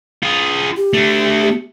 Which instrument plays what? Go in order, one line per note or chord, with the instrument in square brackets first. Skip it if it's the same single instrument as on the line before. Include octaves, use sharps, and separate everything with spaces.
[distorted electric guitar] F4 G#4
[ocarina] G4
[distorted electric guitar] A3 D4